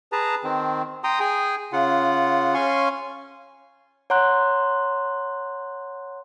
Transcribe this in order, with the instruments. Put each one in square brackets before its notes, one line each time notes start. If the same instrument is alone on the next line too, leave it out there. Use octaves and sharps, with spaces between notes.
[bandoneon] G#4 B4 A5 A#5
D#3 C4
G5 A#5 C6 D#6
G#4 G5 G#5
C#3 F4 F#5
C#4 F5 G#5 C6 C#6
[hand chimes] C#5 F#5 A#5 C6 F#6